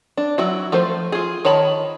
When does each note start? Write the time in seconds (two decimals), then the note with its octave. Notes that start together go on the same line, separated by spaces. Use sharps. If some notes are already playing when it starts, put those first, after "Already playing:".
0.17 D4
0.38 F#3 E4 F#4
0.72 F3 A3 F4 C5
1.12 F4 G#4
1.45 D#3 C#5 A5 B5